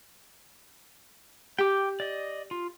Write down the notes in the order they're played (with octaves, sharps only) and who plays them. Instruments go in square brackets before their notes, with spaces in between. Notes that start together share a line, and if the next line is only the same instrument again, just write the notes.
[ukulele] G4 [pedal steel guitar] G5 D6
[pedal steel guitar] D5 D#5
F4